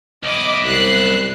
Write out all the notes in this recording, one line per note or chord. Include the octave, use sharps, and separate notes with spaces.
B1 E4 D#5 D6
C2 F#6 C7